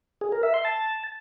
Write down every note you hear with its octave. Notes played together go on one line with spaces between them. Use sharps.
G#4
A#4
E5
C6
A5